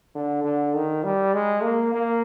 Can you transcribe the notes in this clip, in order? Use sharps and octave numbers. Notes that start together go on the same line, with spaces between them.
D3
D3
D#3
G3
G#3
A#3
A#3